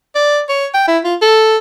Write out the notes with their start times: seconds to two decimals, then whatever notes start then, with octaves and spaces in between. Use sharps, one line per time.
0.15 D5
0.49 C#5
0.74 G5
0.88 E4
1.04 F4
1.22 A4